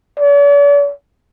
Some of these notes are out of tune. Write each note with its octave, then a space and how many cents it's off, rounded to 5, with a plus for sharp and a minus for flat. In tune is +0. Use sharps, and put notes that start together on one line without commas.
D5 -45